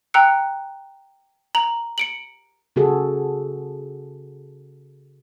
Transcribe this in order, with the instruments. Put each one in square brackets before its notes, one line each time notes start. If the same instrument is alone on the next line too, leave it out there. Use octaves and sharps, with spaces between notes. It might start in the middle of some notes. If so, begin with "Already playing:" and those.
[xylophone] G5 A#5 E6 F#6 C#7
A#5 F#7
C#7 D7 F#7
[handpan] C#3 F#4 G#4 A4